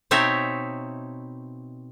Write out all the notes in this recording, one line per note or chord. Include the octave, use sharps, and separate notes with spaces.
B2 C4 D#4 C#5 E5